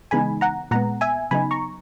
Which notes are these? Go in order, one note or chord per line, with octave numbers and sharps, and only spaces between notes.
C#3 E3 G#3 B3 D#4 G#5 B5
F#5 A#5
A#2 G#3 B3 F#5 A#5
E5 G#5
C#3 F#3 B3 D#4 G#5 B5
A#5 C#6